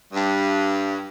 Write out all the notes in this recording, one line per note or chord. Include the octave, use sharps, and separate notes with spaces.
G2